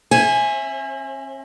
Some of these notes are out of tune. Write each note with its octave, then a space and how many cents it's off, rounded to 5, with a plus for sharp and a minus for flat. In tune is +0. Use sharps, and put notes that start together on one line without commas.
C4 +45 E5 +0 G#5 +0